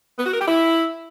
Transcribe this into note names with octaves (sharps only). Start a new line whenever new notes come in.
B3
F#4
A#4
G4
E4